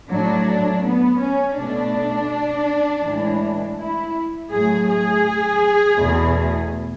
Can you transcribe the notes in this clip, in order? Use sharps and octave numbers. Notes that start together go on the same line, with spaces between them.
A2 F#3 A3 D4
B3
C#4
B2 A3 D4
A2 E3 G#3
E4
A2 F#3 A3 G#4
G#4
E2 B2 A3